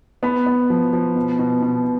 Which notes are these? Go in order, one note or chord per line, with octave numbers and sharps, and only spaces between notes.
B3 B5
B3
F3
F3
B2
B2
B2